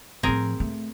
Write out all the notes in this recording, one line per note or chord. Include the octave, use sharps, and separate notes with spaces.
A2 F3 C4 G#4 A#4
A3